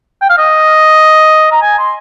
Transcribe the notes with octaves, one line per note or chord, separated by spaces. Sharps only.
G5
F5
D#5
A#5
G#5
C6